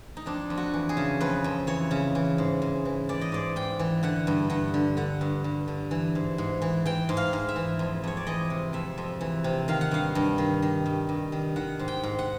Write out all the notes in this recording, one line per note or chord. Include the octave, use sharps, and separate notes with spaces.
D#4
F2 D4
F2
F#4
E3
G#4
C#3
F2 B4
F2
E3 C#5
C#3
E3
G#2
G#2
E3
E3 D5
D#5
G#2 D5
G#2 G5
E3
D3 F#5
G2
G2 F#5
D3
D3 F#5
G2
G2
D3
E3
G#2
G#2
E3
E3 G5
G#2
F5
G#2
E5
E3
F2
F2 C#5
D5
E3 D#5
C3
F2 E5
F2
E3
C3
D#3 F5
F#5
G2 F5
G2
D#3
D#3
G2
G2
D#3
D#3 F#5
G#2
G5
G#2
F#5